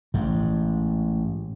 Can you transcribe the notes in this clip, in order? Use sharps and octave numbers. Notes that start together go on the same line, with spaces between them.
A1 G#2